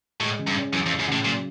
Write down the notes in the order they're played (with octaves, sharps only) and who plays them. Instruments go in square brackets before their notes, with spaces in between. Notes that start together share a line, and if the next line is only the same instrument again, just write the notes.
[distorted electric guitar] A2 [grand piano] G#3
[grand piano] C#3
[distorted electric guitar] G2
[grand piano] C#4
[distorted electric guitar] F#2 [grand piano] E3
[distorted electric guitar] F2
[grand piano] G#3
[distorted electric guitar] F#2
[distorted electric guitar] A2 [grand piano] C#3
[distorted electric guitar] A#2 [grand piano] F#3